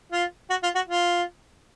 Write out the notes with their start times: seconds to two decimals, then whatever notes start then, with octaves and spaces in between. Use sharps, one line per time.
0.12 F4
0.50 F#4
0.63 F4
0.75 F#4
0.88 F4